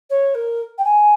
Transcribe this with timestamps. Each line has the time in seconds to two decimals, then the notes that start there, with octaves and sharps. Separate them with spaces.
0.10 C#5
0.34 A#4
0.78 G5
0.84 G#5